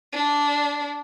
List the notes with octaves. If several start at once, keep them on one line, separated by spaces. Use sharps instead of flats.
D4